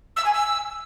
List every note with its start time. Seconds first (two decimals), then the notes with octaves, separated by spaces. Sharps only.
0.16 E6
0.25 G#5
0.33 E6